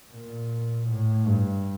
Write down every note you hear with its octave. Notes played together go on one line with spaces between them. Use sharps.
A#2
A2
G2